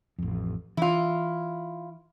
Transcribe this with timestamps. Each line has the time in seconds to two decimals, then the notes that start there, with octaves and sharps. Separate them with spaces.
0.18 A1 F2
0.77 E3 E4 F4